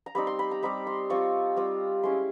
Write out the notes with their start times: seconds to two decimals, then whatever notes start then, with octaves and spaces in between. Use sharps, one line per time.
0.06 A#5
0.15 G3 C4 D#4 B5
0.27 C6
0.39 B5
0.51 A#5
0.63 G3 C4 D#4 B5
0.87 C6
1.10 G3 C4 F4 C#6
1.57 G3 C4 F4
2.03 G#3 C#4 E4 C6